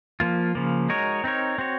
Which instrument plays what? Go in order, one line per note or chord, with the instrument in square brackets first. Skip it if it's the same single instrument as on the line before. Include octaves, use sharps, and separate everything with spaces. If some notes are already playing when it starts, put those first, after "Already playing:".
[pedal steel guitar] F3 A#3 F4
C#3 F3 A#3
G#3 D#4 F#4 A#4 C#5
C4 D#4 A#4 C#5
C4 F#4 C#5